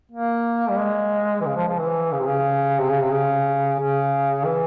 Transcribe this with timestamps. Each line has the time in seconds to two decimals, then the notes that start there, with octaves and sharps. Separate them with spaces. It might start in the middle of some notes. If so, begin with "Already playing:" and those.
0.11 A#3
0.70 G3
0.79 G#3
1.41 E3
1.46 C#3
1.56 F3
1.67 F3
1.79 E3
2.12 C#3
2.19 C3
2.27 C#3
2.79 C3
2.90 C#3
3.02 C3
3.12 C#3
3.79 C#3
4.45 E3